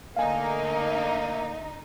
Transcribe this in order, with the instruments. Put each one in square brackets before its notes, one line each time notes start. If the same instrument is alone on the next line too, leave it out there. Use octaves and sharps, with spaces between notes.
[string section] D3 D#4 [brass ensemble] A3 A#3 [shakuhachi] D#5 [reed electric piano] F5 G#5